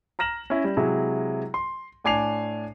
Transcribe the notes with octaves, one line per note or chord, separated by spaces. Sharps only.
A#5 F6 A#6 E7 F#7
C#4 E4
G3
C3 F#3 G#3 E4 G#4
C6
A2 D4 G#5 D6 C7 F7